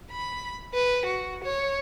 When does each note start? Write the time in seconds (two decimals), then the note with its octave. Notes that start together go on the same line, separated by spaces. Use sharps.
0.11 B5
0.74 B4
1.06 F#4
1.44 C#5